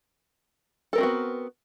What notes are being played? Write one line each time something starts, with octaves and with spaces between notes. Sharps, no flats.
B3 C4 F#4 A4 A#4